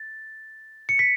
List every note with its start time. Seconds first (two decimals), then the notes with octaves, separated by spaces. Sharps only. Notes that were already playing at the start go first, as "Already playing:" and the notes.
Already playing: A6
0.89 C#7
0.99 B6